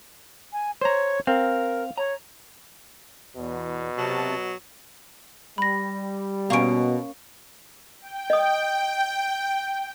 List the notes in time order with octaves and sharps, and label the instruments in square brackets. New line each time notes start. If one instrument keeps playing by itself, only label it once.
[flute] G#5
[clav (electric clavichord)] C5 A#5 [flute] C#5
[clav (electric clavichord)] C4 [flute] A#4 [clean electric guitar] F5
[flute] C#5 [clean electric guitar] A#5
[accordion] E2 [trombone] B2
[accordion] C3 A5 [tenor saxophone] F#3
[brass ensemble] G3 [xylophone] B5 A#6
[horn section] B2 [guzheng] A#3 C#4 [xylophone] F5 C#6 D7
[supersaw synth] G5
[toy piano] D#5 D#6